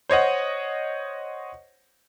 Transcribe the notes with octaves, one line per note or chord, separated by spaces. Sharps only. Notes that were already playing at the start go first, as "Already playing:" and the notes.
C5 C#5 D#5 F#5